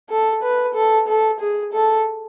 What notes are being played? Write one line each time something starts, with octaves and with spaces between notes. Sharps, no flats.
A4
B4
A4
A4
G#4
A4